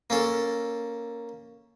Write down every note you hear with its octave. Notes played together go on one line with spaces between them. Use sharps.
A#3 C#4 A4